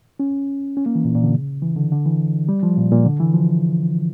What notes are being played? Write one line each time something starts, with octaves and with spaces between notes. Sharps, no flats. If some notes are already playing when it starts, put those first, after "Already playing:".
C#4
C#4
A#3
E3
A#2
A#2
D3
C#3
E3
D3
D3
E3
G3
F3
A#2
A#2
D3
E3
F3